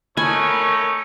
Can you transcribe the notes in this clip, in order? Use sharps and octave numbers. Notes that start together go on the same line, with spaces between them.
A3 D#4 A#4 C#5 G#5 B5